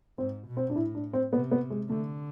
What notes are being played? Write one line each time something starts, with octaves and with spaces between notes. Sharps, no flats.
G#2 C4
B2
C4
D4
A2 E4
D4
C4
C3 B3
B3
G#3
D3 A3